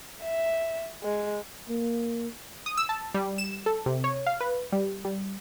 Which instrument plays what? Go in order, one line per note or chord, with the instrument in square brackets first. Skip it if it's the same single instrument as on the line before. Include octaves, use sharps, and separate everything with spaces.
[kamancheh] E5
G#3
[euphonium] A#3
[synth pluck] D#6
E6
A5
G3
E7
A4
C3
C#5
F5
B4
G3
G3